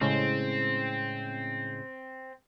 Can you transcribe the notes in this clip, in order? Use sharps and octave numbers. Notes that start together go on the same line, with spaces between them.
A2 C#3 G#3 C4